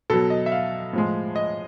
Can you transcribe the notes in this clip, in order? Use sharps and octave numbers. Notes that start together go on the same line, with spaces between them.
B2 F#3 A4
D#5
E5
F5
A2 F3 G#3
D#5